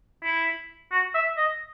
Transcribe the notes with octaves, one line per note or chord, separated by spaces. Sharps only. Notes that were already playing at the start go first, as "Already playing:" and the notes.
E4
F#4
E5
D#5